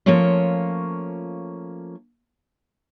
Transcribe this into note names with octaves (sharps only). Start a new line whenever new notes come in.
F3 A3 A#3 C#4 F4 C#5